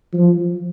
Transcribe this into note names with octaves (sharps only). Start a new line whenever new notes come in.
F3